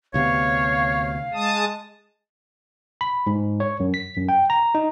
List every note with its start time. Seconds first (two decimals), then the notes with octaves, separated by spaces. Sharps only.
0.14 D2 C3 B3 C#5 F5
1.34 G#3 A5 D#6
3.01 B5
3.27 G#2
3.60 C#5
3.80 F#2
3.94 B6
4.17 F#2
4.29 G5
4.50 A#5
4.75 D#4